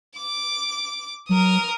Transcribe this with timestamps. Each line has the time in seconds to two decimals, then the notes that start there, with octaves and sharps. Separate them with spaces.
0.17 D6
1.29 F#3 A#4 D#6